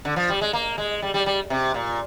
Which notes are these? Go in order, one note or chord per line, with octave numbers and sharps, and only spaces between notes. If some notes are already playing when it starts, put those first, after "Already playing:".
D3
F3
G3
G#3
A#3
G#3
G3
G3
G3
C3
A#2